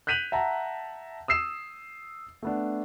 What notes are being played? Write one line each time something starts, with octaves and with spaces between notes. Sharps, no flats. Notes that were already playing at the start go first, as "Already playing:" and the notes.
F#6 G6 B6 D#7 F7 F#7
E5 F#5 A5 A#5
D#6 E6 C7 E7
A3 B3 D4